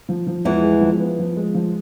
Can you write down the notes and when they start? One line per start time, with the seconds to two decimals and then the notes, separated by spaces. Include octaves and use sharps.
0.09 F3
0.27 F3
0.45 E2 E3 G#3
0.63 G#3
0.81 F3
1.00 B3
1.19 F3
1.37 G#3
1.54 F3